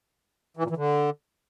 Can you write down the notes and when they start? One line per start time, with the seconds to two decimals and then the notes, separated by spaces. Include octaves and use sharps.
0.57 E3
0.64 A#2
0.70 E3
0.77 D3